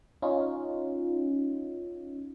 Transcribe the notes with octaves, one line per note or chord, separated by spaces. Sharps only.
C#4 D#4 F4